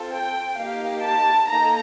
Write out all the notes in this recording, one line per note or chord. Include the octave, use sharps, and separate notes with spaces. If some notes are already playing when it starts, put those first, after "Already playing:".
Already playing: C4 F4 A4
G5
A#3 D#4 G4 F5
A5
A#3 D#4 A4 A#5